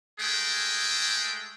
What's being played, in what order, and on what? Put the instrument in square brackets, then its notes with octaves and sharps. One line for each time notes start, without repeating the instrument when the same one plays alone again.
[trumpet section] G#3 A3 G#4 G5